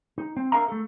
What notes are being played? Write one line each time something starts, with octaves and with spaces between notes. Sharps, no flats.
D#4
C4
D4 A#4 E5 F5 A#5
A3 A4